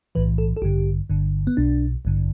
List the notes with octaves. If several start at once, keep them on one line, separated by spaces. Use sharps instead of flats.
B1 A2 E3 B4
A4
A4
A1 G2 D3 G4
G1 G2 D3
B3
B1 B2 D4
A1 G2 D3